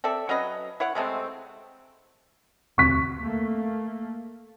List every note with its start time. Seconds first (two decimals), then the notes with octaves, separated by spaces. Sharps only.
0.04 C4 A4 D5 E5
0.29 F#3 C#4 B4 D#5
0.80 E4 C#5 F#5
0.95 C3 G#3 A3 C4
2.78 E1 D2 C4 C#6 B6
3.19 A3 A#3